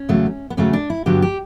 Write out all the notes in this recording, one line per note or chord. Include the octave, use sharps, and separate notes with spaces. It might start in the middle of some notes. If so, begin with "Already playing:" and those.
Already playing: C#4
E2 C#3 F#3 A3
B3
E2 C#3 F#3 A3 C#4
D4
E4
G2 D3 F#3 B3 G4
G4